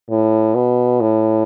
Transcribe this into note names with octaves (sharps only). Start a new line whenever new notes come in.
A2
B2
A2